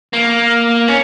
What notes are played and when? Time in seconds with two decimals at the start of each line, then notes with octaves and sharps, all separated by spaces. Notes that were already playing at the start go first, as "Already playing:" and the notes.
0.13 A#3
0.88 C#4